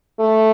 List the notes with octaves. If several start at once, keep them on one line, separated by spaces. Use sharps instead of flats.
A3